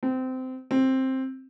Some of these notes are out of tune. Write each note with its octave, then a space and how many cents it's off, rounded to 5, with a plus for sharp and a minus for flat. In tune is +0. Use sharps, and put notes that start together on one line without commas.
C4 -20
C4 +10